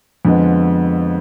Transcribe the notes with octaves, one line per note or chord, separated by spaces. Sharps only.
F2 D3 F3 G#3 B3